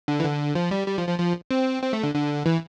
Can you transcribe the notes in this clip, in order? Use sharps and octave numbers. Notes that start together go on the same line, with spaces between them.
D3
E3
D3
F3
G3
G3
F3
F3
F3
C4
C4
A3
D3
D3
E3